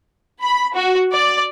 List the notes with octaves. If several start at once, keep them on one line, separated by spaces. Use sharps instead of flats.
B5
F#4
D5